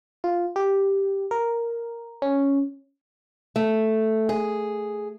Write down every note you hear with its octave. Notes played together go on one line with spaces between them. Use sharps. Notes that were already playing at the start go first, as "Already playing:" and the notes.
F4
G4
A#4
C#4
A3
G#4